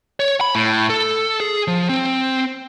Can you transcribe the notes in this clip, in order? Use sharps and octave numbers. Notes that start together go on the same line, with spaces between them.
C#5
B5
A2
A4
G#4
F3
C4